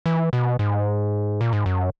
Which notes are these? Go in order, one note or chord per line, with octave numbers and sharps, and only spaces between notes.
E3
B2
G#2
A#2
G#2
F#2